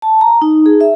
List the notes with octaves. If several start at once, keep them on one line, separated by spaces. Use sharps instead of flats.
A5
A#5
D#4
G#4
E5